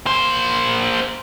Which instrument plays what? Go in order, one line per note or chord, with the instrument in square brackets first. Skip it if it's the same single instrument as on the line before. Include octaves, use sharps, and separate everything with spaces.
[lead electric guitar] A#3 C5